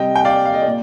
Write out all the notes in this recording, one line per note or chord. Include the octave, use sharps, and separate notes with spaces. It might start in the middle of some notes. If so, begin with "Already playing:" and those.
Already playing: C3 G3 D#5 G5
G5
D5 F5
F5
D#5
D5
A#2